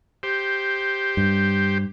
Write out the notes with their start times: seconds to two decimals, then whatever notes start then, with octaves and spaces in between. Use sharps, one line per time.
0.23 G4 C5
1.17 G2